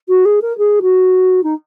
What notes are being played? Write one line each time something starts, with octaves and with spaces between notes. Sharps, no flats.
F#4
G#4
A#4
G#4
F#4
D#4